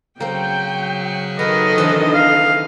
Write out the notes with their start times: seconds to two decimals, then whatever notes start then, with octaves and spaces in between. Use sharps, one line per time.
0.20 C#3 F#3 A#3 C4 G5
1.39 D#3 B3 A4 A#4 D#5
1.78 E3 C4 D4
2.14 F5